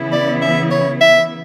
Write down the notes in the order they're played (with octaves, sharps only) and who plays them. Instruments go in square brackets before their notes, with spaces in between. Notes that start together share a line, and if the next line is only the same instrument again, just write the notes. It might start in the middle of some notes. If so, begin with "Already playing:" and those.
Already playing: [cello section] C#3 E3 B3 E4
[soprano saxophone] D5
E5
C#5
E5